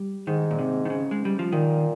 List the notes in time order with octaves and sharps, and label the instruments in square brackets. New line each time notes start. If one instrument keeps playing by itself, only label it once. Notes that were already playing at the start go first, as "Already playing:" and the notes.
Already playing: [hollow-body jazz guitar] G3
[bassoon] G#2 [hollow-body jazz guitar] D#3
[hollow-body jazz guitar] A#2
C3
D#3
C#3
G#3
G3
F3
[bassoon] A#2 [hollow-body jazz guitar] D#3